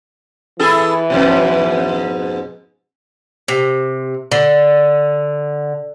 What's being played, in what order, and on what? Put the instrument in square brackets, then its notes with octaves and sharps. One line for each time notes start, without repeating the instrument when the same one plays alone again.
[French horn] E3 [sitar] E4 G#4 A4
[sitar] F2 G#2 B2
[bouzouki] C3
D3